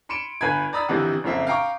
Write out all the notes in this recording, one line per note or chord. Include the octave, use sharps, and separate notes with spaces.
B5 C6 C#7 D7 E7
G1 B4 G#5 B5 G#6
D5 A#5 B5 D#6 E6 A6
G1 C3 D#3 E3 F#5
F#1 F2 A#3 C4 E5
F5 G5 A#5 C#6 D6